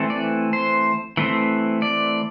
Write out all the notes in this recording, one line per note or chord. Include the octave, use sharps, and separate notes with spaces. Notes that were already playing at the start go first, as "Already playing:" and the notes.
Already playing: E3 A3 C4
D5
C5
E3 A3 C4
D5